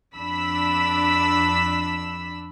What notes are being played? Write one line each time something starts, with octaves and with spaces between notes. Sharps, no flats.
F2 D4 B5 E6 B6